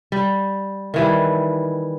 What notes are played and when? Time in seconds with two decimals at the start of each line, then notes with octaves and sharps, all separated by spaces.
0.12 G3
0.94 D#3 E3 G3